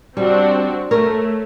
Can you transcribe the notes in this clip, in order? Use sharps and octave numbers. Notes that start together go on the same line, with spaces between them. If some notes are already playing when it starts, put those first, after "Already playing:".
G3 C4 D4 F#4
A3 A#4 C#5